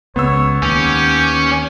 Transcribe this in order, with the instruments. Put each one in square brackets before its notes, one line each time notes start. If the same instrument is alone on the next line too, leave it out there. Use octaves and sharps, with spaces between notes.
[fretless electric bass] C#2 [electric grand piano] B3 E6 [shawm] C#5
[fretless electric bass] D#2 [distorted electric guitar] C#4 [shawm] G4